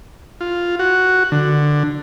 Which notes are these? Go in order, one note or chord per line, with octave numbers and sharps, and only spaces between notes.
F4
F#4
D3